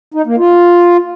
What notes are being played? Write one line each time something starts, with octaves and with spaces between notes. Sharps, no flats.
D#4
A#3
F4